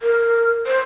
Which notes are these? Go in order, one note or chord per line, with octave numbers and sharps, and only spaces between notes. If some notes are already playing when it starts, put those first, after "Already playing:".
A#4
C5